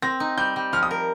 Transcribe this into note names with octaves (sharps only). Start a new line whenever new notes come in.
C4 A#6
D#4
G3 G6
G3
F3 F6
D#6
A#4